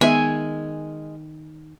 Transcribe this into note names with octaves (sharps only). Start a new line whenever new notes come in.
D#3 G#3 B3 E5 G#5